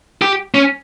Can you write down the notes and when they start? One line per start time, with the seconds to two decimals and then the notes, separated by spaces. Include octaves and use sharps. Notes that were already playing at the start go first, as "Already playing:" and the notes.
0.22 G4
0.54 C#4